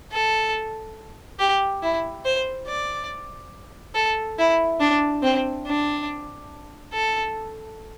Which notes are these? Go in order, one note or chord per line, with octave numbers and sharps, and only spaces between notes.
A4
G4
E4
C5
D5
A4
E4
D4
C4
D4
A4